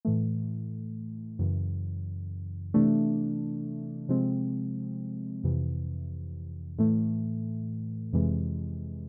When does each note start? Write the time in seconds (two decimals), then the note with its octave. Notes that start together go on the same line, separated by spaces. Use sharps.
0.05 A2 E3 A3
1.39 F#2 C#3 E3
2.74 C3 E3 A3 D4
4.09 C3 F3 G#3 C4
5.44 F2 C3 E3
6.78 A2 E3 A3
8.13 F2 C3 E3 G#3